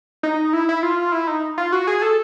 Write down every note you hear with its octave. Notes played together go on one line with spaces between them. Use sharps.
D#4
E4
E4
F4
E4
D#4
F4
F#4
G#4
A4